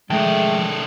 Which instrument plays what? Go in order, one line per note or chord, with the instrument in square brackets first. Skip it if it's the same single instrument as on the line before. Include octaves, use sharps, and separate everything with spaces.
[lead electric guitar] D#3 A4 [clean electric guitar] F3 G5 A5 [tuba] G#3 [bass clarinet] A3